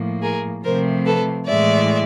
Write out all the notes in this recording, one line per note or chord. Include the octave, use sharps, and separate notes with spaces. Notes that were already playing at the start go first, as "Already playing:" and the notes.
Already playing: A2 F3 A#3
G#4 A#4
C3 F3 A3 C4 A#4 C5
A4 B4
A2 E3 G#3 D5 E5